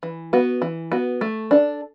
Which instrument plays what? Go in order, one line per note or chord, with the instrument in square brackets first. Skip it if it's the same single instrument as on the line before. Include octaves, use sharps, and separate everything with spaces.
[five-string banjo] E3
B3 F#4
E3
B3 F#4
A3
D4 A4